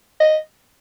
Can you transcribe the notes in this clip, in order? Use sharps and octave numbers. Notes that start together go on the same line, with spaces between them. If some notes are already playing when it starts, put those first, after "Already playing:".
D#5